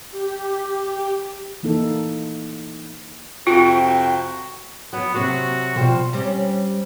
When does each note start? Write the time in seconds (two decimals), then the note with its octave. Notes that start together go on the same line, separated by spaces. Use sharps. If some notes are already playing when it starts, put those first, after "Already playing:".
0.11 G4
1.63 E3 A#3 D#4 E4 A4
3.47 F2 C3 F4 F#4 G5
4.93 F#3 B3
5.14 C3 F#3 F#4
5.76 B2 F3 G3 C5
6.13 G3 C4 C#4